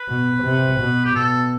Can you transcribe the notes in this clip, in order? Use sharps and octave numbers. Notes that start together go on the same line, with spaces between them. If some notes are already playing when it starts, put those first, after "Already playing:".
Already playing: B4
B2
C3
B2
G4
B2 A4